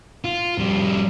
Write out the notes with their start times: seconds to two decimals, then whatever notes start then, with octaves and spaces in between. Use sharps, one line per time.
0.24 F4
0.58 F2 G3